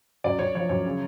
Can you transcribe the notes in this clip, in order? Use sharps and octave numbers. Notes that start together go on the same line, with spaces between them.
F#2 D5
F#2 C#5
F3 C#5
F#2 C#5
C#3